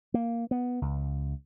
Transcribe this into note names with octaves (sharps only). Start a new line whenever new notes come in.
A#3
B3
C#2